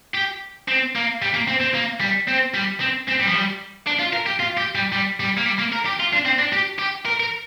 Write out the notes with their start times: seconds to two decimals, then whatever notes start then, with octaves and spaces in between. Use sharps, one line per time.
0.15 G4
0.68 C4
0.95 A#3
1.22 G3
1.34 A#3
1.48 C4
1.61 C4
1.74 A#3
2.00 G3
2.28 C4
2.54 G3
2.80 C4
3.08 C4
3.20 G3
3.27 F3
3.34 G3
3.87 D4
3.99 F4
4.13 A#4
4.26 G4
4.40 F4
4.57 G4
4.75 G3
4.92 G3
5.20 G3
5.37 A#3
5.46 G3
5.59 A#3
5.72 A#4
5.86 G4
6.00 F4
6.13 D4
6.25 C4
6.39 D4
6.53 G4
6.79 G4
7.06 A#4
7.20 A#4